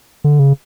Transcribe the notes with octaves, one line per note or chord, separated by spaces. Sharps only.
D3
C#3